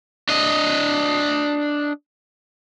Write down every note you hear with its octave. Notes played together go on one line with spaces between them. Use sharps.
D4 D#5